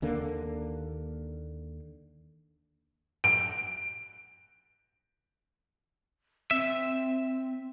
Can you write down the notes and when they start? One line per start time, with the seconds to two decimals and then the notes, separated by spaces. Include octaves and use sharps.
0.02 D#2 D3 A#3
3.24 D7
6.51 C4 E5